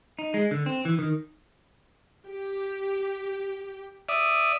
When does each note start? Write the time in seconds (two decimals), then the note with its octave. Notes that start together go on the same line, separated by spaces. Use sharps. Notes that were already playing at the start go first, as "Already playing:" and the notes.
0.19 D#4
0.34 G#3
0.51 D3
0.66 C4
0.85 E3
0.99 D#3
2.27 G4
4.09 D5 E5 D#6